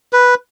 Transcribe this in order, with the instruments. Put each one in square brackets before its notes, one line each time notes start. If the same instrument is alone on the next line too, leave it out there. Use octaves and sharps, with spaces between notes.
[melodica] B4